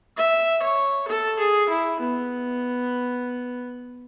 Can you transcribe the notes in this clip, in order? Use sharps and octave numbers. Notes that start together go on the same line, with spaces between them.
E5
C#5
A4
G#4
E4
B3